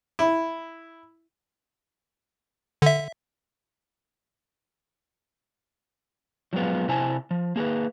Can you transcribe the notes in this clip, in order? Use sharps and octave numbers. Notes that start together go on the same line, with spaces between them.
E4
D3 E5
F3 F#3 G#3 B3 F4
C3 E4 C5 G#5 A5
F3
A#3 G#4 A4 B4